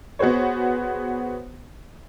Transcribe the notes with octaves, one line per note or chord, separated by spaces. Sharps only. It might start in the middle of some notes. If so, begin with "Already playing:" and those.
B3 F#4 G#4 C5 C#5